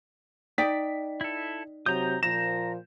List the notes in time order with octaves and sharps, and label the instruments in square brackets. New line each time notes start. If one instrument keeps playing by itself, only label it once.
[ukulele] D#4 D5 G5 [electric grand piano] B6
[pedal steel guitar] E4 A4
[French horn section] C3 F#3 [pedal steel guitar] A#5 D#6 [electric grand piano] G6
[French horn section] A#2 F3 [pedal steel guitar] A#5 [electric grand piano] E7